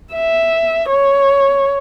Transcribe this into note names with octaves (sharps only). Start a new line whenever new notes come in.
E5
C#5